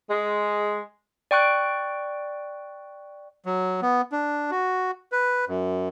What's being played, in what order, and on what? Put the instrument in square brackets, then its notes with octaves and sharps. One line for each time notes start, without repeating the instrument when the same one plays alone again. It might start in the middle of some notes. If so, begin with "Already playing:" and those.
[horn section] G#3
[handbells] D5 G5 C#6 F#6 D7
[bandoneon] F#3
B3
D4
F#4
B4
F#2